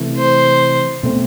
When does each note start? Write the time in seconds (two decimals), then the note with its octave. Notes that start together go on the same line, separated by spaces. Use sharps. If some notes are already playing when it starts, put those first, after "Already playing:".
Already playing: C3 E3 A3
0.18 C5
1.03 B2 A3 C4